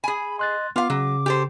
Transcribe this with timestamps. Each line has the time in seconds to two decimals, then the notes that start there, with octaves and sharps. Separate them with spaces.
0.04 G#4 G#5 B5
0.39 D#5 C6 F#6 A6
0.76 B3 F4 F5 D6
0.90 C#3 F#3
1.26 G4 A4 C5